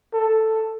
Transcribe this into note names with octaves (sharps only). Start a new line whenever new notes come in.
A4